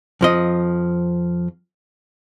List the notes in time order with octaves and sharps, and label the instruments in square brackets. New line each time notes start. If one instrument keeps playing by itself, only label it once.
[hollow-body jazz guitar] F2 F3 D#5